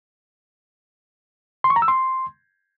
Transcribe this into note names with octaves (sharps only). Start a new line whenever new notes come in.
C6
C#6
A#5
E6
C6